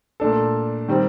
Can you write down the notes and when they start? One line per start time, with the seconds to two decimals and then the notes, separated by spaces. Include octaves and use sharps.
0.20 A#2 A3 D4 A4
0.88 D#3 G3 C4